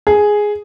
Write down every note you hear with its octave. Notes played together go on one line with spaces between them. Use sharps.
G#4